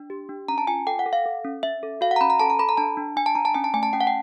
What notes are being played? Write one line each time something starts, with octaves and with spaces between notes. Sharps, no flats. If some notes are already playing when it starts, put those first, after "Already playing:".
Already playing: D4
G4
D4
C#4 A#5
A5
F4 G#5
A4 G5
F#5
A4
F5
A4
C#4
C#4 E5
A4
F#4 F5
F#5
A#5
C#4 B5
A#5
A4 A5
A#5
A4 B5
A#5
D4 A5
D4
D4 G#5
A5
D4 A#5
A5
C#4 G#5
A5
A3 G#5
A5
C#4 G5
F#5
G5